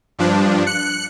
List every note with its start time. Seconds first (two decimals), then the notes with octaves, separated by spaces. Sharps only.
0.19 G2 F3 D4
0.66 F#6 C#7